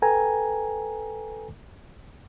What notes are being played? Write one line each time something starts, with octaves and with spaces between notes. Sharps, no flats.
A4 B4 G5 G#5 A#5